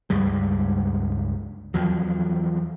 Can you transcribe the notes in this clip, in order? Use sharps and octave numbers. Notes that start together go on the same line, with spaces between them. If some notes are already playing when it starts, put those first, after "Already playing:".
C#2 G2 G3 G#3
E2 F3 F#3